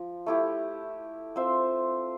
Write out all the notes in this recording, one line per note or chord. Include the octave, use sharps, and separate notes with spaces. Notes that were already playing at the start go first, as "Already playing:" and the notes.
Already playing: F3
A3 E4 G4
C4 F4 C5 E5